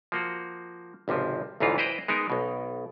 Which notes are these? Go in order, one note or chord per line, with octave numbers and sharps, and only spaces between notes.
F3 A#3 F#4
G#1 C#2 C3 F3
A1 D2 G#2 E3 D#4 F4
E4 B4 C5 D#5 G5 A#5
G#3 B3 D#4 A#4
B1 B2